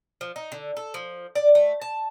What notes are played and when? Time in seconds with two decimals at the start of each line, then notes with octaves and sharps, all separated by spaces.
0.21 F3
0.36 D#4
0.52 D3
0.77 A4
0.94 F3
1.35 D5
1.55 A3
1.82 A5